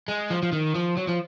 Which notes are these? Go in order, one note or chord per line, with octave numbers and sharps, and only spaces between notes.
G#3
F3
F3
D#3
F3
F#3
F3